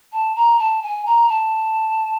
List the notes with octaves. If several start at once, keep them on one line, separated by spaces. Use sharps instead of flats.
A5
A#5
A5
G#5
A#5
A5